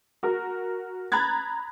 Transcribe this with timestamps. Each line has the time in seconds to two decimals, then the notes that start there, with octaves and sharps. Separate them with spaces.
0.23 F#4 A#4
1.12 A#5 B5 F#6 G#6 A6